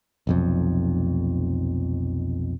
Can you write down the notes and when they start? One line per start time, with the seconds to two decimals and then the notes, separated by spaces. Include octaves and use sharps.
0.27 F1 B1 F2